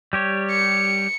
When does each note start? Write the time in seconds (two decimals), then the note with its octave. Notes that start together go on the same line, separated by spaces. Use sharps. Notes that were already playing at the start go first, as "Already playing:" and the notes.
0.13 G3 G4 C#5
0.51 C#7